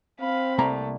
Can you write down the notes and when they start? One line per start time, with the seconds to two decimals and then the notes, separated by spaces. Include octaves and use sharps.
0.20 C4 F5 B5
0.58 C2 A3 A#3 A#5